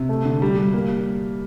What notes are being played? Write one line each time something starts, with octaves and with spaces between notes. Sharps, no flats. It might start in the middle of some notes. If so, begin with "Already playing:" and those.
Already playing: C3
A3
D3
G3
G3
A#3